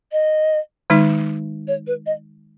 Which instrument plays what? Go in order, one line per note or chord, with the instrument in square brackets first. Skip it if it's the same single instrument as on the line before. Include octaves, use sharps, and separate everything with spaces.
[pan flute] D#5
[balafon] D#3 G#3 D#4
[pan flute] C#5
B4
D#5